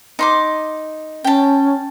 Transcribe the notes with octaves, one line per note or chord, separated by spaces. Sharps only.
D#4 C6 D6
C#4 G5 A5